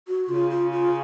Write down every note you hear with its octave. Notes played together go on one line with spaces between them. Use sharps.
F#4
C#3 F4
F4
F4